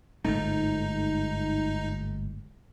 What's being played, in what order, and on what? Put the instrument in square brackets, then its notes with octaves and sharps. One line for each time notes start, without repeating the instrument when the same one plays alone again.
[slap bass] G1 G#2 A3 [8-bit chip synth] D#4